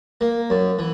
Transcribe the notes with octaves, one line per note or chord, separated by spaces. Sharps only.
A#3
F#2
E3